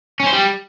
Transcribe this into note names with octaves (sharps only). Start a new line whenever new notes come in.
C#4
C5
G3